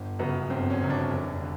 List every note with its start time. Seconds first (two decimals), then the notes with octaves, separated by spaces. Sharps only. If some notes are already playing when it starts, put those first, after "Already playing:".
Already playing: G1
0.19 F#2 C#3 B3
0.50 G1 C4
0.70 C#4
0.80 F#2 C#3
0.90 D4
1.11 F1
1.41 D3